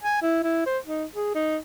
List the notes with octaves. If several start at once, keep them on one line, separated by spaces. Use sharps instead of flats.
G#5
E4
E4
C5
D#4
G#4
D#4